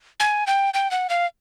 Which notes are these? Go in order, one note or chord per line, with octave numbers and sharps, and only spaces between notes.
G#5
G5
G5
F#5
F5